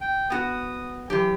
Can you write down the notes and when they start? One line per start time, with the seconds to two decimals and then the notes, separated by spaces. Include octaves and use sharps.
0.01 G5
0.30 B3 F#4 D#6
1.10 E3 F#3 G4